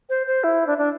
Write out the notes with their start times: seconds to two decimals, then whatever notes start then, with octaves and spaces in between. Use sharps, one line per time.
0.09 C5
0.27 C5
0.44 E4
0.67 D4
0.78 D4